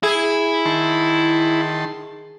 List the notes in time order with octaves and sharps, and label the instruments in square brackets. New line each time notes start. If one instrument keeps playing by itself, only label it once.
[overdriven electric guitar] E4 [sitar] G#4
[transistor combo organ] D#3 A5 C6